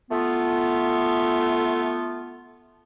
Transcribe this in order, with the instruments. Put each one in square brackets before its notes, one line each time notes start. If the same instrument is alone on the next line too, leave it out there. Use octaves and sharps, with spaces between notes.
[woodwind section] A3 B3 F4